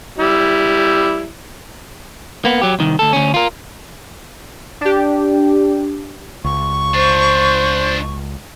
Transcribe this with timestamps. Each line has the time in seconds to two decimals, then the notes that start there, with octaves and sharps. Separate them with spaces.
0.18 G3 E4
2.45 A#3 B3
2.61 F#3 G4
2.79 C2 D#3
2.99 D2 A4
3.13 D2 C#4
3.34 F4 A#4
4.81 D4 G4
6.45 C#2 C#6
6.94 D4 F4 C5